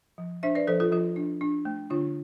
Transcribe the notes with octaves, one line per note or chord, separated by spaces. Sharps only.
F3
D4 C5 E5
B4 D5
F3 A4 C5
F4 A4
F3 F4 A4
D4
D4
A3
D3 D4 F4